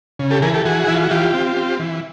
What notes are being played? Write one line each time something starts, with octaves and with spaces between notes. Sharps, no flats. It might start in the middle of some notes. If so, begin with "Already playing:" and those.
C#3
G4 A4
E3 G#4 A#4
G4 A4
E3 F#4 G#4
E3 E4
F4
F#4
E3 F4 G4
C4
C4
E3